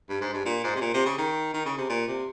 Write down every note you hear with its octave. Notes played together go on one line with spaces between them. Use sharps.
G2
G#2
G2
A#2
G#2
C3
A#2
C3
C#3
D#3
D#3
C#3
C3
A#2
C3